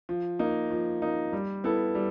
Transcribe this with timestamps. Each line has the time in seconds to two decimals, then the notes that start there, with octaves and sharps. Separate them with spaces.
0.09 F3
0.39 A#3 D#4
0.71 F3
1.02 A#3 D#4
1.33 G3
1.64 B3 E4 A4
1.95 G3